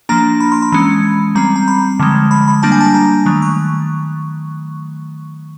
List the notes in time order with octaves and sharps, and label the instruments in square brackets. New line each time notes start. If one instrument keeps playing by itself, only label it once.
[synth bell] F3 A#3 D4 A#5
B5
C6
B5
E3 G#3 C#4
G3 C4 A#5
A#5
B5
D3 F3 G#3
B5
B5
G3 A#3 D4 A5
G#5
A5
A#5
D#3 F#3 A3
C#6